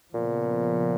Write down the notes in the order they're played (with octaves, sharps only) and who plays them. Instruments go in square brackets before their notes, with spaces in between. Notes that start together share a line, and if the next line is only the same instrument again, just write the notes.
[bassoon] A#2 [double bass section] C#3 F3 B3